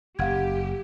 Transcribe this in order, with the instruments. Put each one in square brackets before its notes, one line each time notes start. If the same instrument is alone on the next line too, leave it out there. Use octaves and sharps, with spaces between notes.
[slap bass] F#1 [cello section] G4 [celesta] F5 F#5 G#6